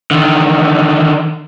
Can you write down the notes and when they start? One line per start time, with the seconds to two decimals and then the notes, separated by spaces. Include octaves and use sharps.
0.11 D3 D#3